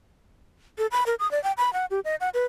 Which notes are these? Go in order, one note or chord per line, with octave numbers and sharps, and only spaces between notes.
A4
B5
A#4
D#6
D5
G5
B5
F#5
G4
D#5
F#5
B4